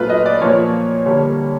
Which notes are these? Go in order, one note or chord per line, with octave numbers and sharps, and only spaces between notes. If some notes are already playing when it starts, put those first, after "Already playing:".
Already playing: A#2 F#3 A3 F4 B4
D#5
D5
A#2 F3 A#3 C#5
D3 G3 A#3 C#5